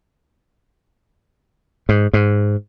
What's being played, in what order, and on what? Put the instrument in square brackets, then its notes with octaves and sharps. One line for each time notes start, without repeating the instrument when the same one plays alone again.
[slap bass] G#2
G#2